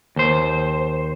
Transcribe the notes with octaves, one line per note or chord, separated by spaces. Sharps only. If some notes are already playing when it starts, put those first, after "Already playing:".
D#2 C5